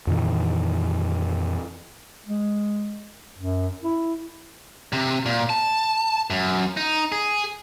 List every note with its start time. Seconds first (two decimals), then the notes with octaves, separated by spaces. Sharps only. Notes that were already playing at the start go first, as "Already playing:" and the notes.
0.07 F2 A#2 D#3 E3
2.26 G#3
3.38 F#2
3.83 E4
4.93 C3
5.26 A#2
5.50 A5
6.30 F#2
6.77 D#4
7.12 G#4